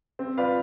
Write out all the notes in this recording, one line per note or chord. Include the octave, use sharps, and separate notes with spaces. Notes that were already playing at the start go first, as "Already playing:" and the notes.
C4
F4 B4 D5 F5